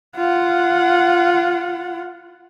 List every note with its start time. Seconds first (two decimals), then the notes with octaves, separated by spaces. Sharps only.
0.16 F4 F#5